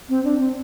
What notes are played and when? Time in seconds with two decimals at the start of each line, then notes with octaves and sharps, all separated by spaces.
0.09 C4
0.24 D4
0.39 C4